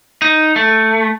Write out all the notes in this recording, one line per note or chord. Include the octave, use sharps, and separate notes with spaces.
D#4
A3